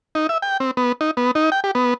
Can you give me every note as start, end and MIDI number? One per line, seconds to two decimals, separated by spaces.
0.15 0.27 63
0.29 0.38 76
0.42 0.57 79
0.60 0.71 60
0.77 0.92 59
1.01 1.11 63
1.17 1.31 59
1.35 1.50 63
1.52 1.60 79
1.64 1.71 67
1.75 1.94 59